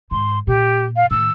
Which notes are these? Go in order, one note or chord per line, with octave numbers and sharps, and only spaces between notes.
G#2 D#3 C6
A#2 G4
F5
A2 D#3 E6